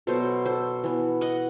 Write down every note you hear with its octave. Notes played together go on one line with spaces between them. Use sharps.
B2 F#3 B3 A4 C5
A4 C5
E3 B3
D#5 F#5